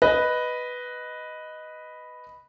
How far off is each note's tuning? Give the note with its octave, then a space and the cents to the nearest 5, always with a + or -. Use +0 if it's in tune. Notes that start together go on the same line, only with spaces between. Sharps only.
B4 +0 D#5 +0